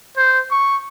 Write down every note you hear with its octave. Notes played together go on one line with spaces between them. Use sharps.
C5
C#6